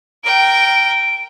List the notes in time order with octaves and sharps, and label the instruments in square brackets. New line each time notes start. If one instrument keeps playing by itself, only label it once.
[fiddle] A#4 G5 [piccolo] D7